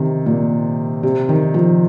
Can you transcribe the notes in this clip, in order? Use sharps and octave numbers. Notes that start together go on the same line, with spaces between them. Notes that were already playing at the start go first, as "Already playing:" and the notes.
Already playing: C3 D#3
A#2
C3
D#3
F3